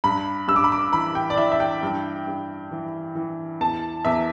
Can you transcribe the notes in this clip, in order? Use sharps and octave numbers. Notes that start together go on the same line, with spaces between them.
G2 B5
G2 E6
D6
B5
D6
E3 B5
G5
D5
E3 E5
E5
G5
G2
G2
E3
E3
E2 A5
E2 E5